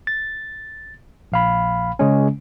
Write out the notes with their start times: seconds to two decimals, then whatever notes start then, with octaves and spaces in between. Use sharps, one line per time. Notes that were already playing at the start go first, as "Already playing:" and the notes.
0.07 A6
1.32 A#1 F5 B5
1.99 C#3 G#3 C#4